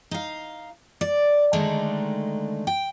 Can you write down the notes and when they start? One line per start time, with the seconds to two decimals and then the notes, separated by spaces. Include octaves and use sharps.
0.11 D#4 F5
1.01 D5
1.53 D3 D#3 G#3 A3 D4 D#4
2.67 G5